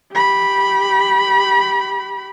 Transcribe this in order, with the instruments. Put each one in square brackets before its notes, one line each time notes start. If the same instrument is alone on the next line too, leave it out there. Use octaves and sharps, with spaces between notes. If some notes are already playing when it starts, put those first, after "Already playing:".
[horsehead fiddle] G4 B5